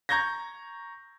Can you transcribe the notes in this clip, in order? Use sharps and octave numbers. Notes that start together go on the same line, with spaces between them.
A#5 C#6 G6 G#6 A#6